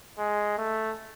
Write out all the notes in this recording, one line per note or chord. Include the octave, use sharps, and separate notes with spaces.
G#3
A3